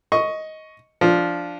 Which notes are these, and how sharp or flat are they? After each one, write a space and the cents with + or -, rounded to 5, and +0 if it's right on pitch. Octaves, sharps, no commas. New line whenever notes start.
D#5 +10 C#6 +0
F3 +0 D4 +0